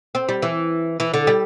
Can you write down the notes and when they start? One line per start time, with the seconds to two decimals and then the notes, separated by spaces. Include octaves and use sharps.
0.15 C4
0.29 G3
0.42 E3
1.00 E3
1.14 D3
1.27 G3